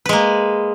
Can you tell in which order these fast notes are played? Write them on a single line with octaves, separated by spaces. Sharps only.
B4 G#3 A#3